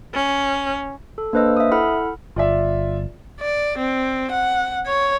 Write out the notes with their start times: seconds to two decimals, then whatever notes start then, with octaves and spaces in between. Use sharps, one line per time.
0.14 C#4
1.18 A4
1.33 A#3 D4 B4 C5 D#5 E6
1.57 E5 D#6
1.71 E4 A4 F#5 B5 F6
2.36 G1 F4 D5 E5
3.40 D5
3.78 C4
4.32 F#5
4.86 C#5